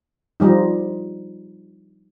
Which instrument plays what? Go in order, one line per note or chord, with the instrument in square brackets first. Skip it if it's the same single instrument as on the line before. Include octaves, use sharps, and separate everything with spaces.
[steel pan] F3 G3 D#4